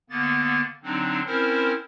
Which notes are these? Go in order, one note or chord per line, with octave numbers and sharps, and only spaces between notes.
D3 A#3 B3 A6
D3 F#3 C4 D4 D#4
C4 C#4 E4 A#4 C5